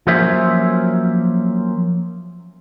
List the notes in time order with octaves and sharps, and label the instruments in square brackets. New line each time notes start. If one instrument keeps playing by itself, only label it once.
[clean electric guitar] F3 F#3 A#3 C#4 C5 E5